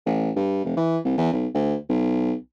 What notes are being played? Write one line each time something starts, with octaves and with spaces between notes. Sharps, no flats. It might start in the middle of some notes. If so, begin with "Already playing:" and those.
A1
G2
F1
E3
C2
E2
B1
D2
B1